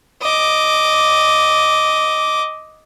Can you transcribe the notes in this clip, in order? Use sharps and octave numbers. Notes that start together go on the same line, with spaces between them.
D#5 D6